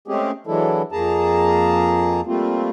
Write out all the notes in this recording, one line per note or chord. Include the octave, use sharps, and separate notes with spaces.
G#3 A3 C4 C#4 G4 G#4
E3 F#3 G#3 D4 E4 A4
F2 A#3 G#4 A5 A#5
G3 A3 A#3 C4 F4